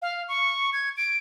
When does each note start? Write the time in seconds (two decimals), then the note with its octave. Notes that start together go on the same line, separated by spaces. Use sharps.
0.02 F5
0.28 C#6
0.73 G#6
0.97 D7